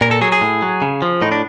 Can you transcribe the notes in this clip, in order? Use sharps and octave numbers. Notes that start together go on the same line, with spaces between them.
A#2 A#4
A4
F#3 G#4
G#4
A2
F#3
C#3
F3
A2 D#4
D4